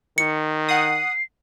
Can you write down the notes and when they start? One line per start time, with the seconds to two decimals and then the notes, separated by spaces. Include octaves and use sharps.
0.18 D#3 C#7
0.68 F#5 D#6 C7